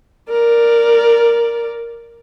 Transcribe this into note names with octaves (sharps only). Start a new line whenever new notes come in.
A#4 D5